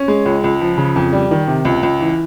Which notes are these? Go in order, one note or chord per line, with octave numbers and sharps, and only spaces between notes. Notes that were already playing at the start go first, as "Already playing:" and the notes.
Already playing: C#4
G#3
C#2
C#2
F3
C#3
F2
G3
D#3
C3
C#2
C#2
E3